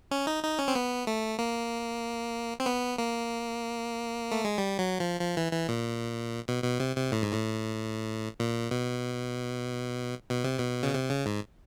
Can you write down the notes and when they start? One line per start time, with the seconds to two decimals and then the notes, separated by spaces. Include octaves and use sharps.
0.11 C#4
0.27 D#4
0.44 D#4
0.59 C#4
0.68 C4
0.75 B3
1.07 A3
1.39 A#3
2.60 C4
2.66 B3
2.98 A#3
4.32 A3
4.45 G#3
4.58 G3
4.79 F#3
5.00 F3
5.21 F3
5.37 E3
5.52 E3
5.69 A#2
6.48 B2
6.64 B2
6.80 C3
6.97 C3
7.12 A2
7.22 G#2
7.33 A2
8.40 A#2
8.71 B2
10.30 B2
10.44 C3
10.58 B2
10.83 C#3
10.94 C3
11.10 C#3
11.26 G#2